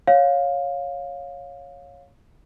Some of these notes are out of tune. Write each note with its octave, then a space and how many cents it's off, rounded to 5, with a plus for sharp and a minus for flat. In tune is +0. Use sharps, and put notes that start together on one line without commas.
C#5 -5 F5 +15